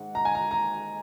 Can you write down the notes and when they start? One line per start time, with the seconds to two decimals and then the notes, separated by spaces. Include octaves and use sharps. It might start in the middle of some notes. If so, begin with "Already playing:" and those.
Already playing: G#2 D#3 F#5
0.15 A#5
0.25 G#5
0.35 A#5
0.51 A#5